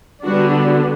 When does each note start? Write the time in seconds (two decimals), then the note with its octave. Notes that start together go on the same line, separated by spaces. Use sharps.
0.23 D3 G3 B3 D4 F#4
0.52 F#4